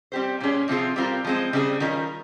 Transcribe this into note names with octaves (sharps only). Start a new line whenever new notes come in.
G3 C4 G4 C5
A#2 G3 C#4 G#4
C3 F3 C4 F4 G#4
G3 C4 F4 A#4
F3 G#3 C4
C#3 G3 C4 D#4 G#4
D#3 G3 C#4 F4 A#4